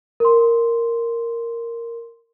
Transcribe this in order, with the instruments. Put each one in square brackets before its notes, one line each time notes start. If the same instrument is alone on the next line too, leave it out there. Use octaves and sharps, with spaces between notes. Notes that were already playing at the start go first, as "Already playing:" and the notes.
[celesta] A#4 C6